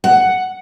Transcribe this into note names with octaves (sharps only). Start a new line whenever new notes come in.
F#5